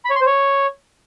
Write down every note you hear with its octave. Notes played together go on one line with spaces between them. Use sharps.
B5
C#5
C6
C5
C#5